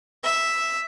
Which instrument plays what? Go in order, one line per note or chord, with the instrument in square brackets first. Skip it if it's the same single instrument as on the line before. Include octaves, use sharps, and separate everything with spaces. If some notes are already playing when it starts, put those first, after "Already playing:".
[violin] E5